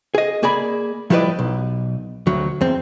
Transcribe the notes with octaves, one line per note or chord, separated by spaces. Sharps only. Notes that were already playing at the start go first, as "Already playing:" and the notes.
G#4 D#5
A#3 G#4 D5 B5
F3 G3 E4 B4 D5 D#5
B1
D2 F#3
E2 C4